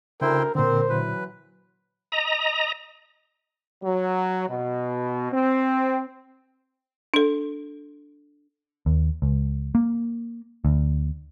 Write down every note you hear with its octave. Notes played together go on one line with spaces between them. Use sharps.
D2 C#3 E4 A#4 C5 G5
A#2 D3 C4 A#4 C5
E3 F#3 B4
D#5 A#5
F#3
B2
C4
D4 A4
D#2
C#2
A#3
D2